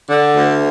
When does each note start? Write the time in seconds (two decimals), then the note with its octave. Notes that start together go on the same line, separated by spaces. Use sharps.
0.09 D3
0.36 D2